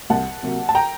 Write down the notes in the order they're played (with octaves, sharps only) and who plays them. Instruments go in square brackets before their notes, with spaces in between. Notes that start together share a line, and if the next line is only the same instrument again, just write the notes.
[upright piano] C2 F#5 A5
C3 F#3 A#3
A5
G5 A#5